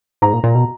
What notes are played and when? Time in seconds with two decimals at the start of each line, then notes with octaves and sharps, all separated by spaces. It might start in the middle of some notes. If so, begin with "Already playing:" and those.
0.22 G#2 A#5
0.33 A#2
0.44 A#2
0.55 B2